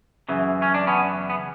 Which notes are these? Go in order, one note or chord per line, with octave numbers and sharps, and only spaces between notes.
F#2 C#3 E3
C#4
D4
B3 C#4
B3